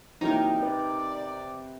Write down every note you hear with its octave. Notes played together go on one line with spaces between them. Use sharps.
C3 E3 F#3 A#3 D#4 A#4
C4 B4 D5